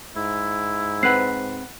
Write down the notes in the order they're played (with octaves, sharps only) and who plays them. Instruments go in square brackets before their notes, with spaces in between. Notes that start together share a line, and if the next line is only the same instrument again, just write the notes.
[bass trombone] G#2 [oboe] E4
[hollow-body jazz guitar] C4 B4 [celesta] F#5 F#6 C7